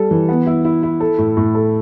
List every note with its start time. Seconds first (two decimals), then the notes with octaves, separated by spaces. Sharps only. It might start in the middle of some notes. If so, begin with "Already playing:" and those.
Already playing: G3 A4
0.11 E3
0.29 B3
0.47 E4
0.65 E4
0.83 E4
1.00 A4
1.18 A2
1.37 A2
1.55 A4